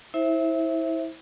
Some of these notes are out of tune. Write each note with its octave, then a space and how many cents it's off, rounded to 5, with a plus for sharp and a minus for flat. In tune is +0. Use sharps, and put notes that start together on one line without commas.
E4 -30 C5 +20 E5 +0